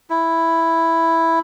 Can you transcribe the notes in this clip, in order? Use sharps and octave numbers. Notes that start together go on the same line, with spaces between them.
E4